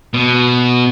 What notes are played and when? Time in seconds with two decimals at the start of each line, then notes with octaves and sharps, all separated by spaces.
0.14 B2